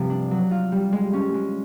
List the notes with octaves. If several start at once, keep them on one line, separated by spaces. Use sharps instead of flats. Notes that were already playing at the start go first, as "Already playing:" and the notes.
Already playing: G2 C3 F3
D4
F#3
F4
G3
G#3
C#4
G#3